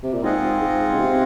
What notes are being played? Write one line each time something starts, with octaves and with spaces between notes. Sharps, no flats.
C3
A#2
G#2 C4 F4 G#4 D#5 F#5
G#2
C#3
C3